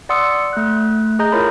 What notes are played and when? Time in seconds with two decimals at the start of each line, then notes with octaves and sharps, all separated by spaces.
0.09 D5 F#5 C6 D#6 E6 C#7
0.53 A3 F#6
1.19 G#4 D#5 A#5 G6
1.32 E4 F4 A#4 C#5 B5